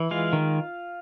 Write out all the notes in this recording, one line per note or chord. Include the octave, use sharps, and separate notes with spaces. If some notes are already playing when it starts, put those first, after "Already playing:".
Already playing: E3
G#3 F4 F5
D#3